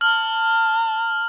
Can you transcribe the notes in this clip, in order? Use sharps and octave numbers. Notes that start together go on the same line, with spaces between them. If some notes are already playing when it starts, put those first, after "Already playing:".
A5 F6 F#7